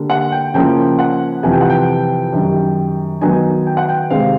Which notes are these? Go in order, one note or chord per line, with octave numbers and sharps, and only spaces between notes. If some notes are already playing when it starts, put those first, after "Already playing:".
Already playing: D3 G3 A#3
F#5
G5
C#3 F3 A#3 C#4 E4 G5
F#5
F2 C3 E3 G#5
G5
F#5
G5
F#2 D#3 G3
D#3 F#3 B3 D#4 G#5
G5
F#5
G5
C3 D#3 G#3 C4 F5